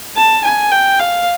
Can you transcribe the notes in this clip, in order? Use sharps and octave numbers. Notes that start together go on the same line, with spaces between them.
A5
G#5
G5
F5